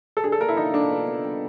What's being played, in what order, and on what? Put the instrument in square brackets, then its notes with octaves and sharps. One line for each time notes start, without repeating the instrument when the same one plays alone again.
[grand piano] A4
[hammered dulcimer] D3 [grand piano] G#4
[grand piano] A4
[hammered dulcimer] A#3 [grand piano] A#4
[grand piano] E4
[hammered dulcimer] F3 [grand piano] D#4
[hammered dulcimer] D3 [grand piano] D4
[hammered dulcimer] B2
B3
G3